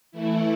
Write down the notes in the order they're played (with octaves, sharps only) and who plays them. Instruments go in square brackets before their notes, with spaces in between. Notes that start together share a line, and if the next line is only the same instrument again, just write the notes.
[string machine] E3 A3 E4